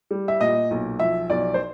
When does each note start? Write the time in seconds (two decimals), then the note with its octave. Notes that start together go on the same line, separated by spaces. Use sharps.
0.11 G3
0.28 E5
0.41 A#2 D#5
0.71 B1
0.99 F3 E5
1.30 B1 D5
1.54 C5